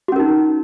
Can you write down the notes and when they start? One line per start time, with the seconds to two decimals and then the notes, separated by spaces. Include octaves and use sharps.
0.08 F#4
0.12 C#4
0.16 A#4
0.20 D#4